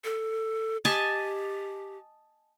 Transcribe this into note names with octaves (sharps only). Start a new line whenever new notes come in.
A4
G4 D#5 G#5 A5